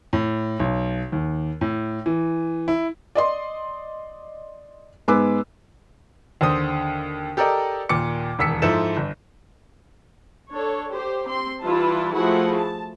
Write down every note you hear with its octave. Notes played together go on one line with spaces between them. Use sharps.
A2
B1
D#2
A2
E3
E4
D5 D#5 C6
G#2 G#3 B3 B4 D6 E6
D#2 D3 C5 D#6
G4 A4 A#4 D5 D#5
D#2 A#2 D6 C#7
E1 D#2 E6 B6 C#7
G#2 F3 E4 A4 E7
G1
D4 A4 C#5
G4 C5
C4 C6
E3 G3 E4 F4 B4 A5
F3 A3 E4 F#4 G#4 F#5
A5